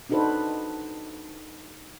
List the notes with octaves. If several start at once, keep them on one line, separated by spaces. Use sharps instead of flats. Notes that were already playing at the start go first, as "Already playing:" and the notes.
D4 D#4 F#4 A4 B4 C5